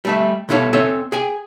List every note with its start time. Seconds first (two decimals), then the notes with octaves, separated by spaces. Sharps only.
0.05 G3 A3 E5
0.49 C2 B2 E4 A4 C#5 F5
0.73 C4 A4 C#5 E5 G#5
1.12 G#4 G5 G#5